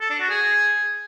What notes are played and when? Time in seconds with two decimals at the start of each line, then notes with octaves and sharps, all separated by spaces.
0.01 A4
0.10 D4
0.20 F#4
0.30 G#4